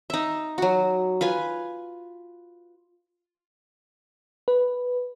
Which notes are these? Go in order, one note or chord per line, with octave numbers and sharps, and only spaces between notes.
D#4 E5
F#3 F#4
F4 B4 G#5
B4